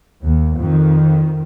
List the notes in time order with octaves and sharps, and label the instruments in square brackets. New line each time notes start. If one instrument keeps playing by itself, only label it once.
[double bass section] D#2
F2 D#3